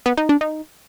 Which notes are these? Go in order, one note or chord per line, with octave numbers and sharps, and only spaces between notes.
B3
D#4
D4
D#4